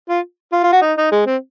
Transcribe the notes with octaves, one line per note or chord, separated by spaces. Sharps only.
F4
F4
F4
F#4
D#4
D#4
G#3
C4